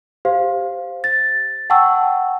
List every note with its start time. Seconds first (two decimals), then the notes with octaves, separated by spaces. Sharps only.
0.25 G4 C5 F5
1.04 A6
1.70 F#5 G5 A5 C#6 E6